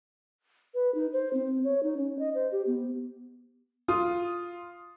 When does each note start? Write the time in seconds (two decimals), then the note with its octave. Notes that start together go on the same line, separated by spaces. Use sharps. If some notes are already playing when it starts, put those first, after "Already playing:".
0.74 B4
0.95 D#4
1.13 C5
1.33 C4
1.64 C#5
1.83 D#4
1.97 C#4
2.19 D#5
2.34 C5
2.52 G4
2.67 B3
3.88 F4 D#6